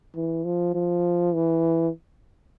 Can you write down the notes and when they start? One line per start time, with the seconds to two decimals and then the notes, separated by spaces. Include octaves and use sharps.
0.15 E3
0.45 F3
0.75 F3
1.34 E3